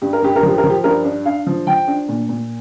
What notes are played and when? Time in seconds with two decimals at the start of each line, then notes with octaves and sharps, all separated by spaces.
0.02 G2 G4
0.13 A#4
0.23 G2 G4
0.36 A#4
0.43 F3 G4
0.58 A#4
0.64 F3
0.70 G4
0.84 G2 A#4
1.05 D4
1.25 D4 F5
1.47 F3
1.67 F3 G5
1.88 D4
2.09 A#2
2.29 A#2